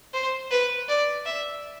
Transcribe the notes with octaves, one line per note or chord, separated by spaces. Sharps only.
C5
B4
D5
E5